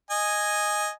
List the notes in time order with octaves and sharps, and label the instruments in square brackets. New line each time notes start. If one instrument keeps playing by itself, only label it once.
[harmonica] D#5 G#5